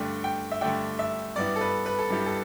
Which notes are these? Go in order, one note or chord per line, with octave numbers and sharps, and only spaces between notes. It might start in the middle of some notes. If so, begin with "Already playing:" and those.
Already playing: G2 D3 A3 D4 G5
G5
E5
G2 D3 A3 D4 G5
E5
G2 G3 B3 E4 D5
A4
B4
B4
A4
G2 G3 B3 E4 G4
A4